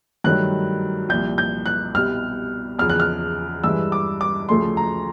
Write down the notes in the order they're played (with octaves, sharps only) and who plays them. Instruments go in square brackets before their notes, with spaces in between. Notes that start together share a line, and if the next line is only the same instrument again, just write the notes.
[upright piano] G2 D#3 F#3 A3 F#6
C2 A#2 F3 G6
G6
F#6
C2 B2 G3 F6
E2 C#3 F3 F6
F#6
F6
G2 E3 G#3 E6
D6
D6
D2 C#3 F3 A3 C6
A#5